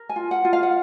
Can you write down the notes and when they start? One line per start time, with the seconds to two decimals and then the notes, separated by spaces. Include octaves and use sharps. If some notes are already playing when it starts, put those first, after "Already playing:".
Already playing: A#4
0.09 G#5
0.16 F4
0.31 F#5
0.45 F4
0.53 F5
0.63 F#5